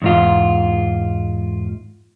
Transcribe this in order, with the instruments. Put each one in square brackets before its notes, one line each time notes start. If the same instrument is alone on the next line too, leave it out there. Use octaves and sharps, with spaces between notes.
[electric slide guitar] E2 G#2 F4